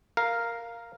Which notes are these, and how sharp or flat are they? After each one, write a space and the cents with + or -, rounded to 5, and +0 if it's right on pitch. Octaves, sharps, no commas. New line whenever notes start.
A#4 +0 F5 +0